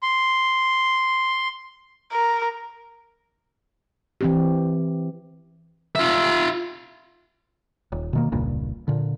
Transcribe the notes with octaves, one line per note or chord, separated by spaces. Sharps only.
C6
A#4
E3 C4 G4
F4 E5
D#1
B2 D#3 A#3
E1 C#2 G2 A#2
A#2 D3